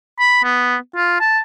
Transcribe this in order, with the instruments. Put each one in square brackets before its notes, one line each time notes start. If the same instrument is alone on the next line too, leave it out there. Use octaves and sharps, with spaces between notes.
[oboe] B5
B3
F4
A5